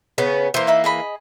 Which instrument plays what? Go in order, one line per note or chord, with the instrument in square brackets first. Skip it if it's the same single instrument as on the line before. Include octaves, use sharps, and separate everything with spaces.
[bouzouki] C#3 B3 C#4
[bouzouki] E3 A#3 [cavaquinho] C5 C6
[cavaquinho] D#4 E5 B5
G#4 D#5 B5